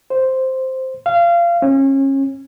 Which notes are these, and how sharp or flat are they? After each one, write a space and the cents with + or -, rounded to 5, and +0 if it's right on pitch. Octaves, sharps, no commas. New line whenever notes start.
C5 +0
F5 -25
C#4 -30